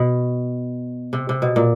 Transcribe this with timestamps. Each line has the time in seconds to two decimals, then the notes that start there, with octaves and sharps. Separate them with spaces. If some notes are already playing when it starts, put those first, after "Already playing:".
Already playing: B2
1.13 C3
1.29 C3
1.42 B2
1.56 A#2